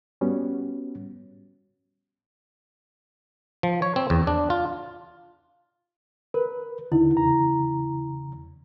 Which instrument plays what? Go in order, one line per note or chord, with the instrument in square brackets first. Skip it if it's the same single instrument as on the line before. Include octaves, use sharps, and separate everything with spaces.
[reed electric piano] G3 B3 C#4 F#4
[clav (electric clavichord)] F3
C#5
C4
E2
D4
F4
[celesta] A#4 [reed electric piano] B4
[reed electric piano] D#2 D3 D#4 [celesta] E4
[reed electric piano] E2 C#3 A#5